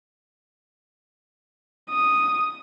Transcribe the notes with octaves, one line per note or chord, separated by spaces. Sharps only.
D#6